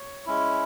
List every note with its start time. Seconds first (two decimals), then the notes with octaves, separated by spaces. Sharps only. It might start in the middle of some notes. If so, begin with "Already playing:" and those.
Already playing: C#5
0.26 G#3 C#4 E4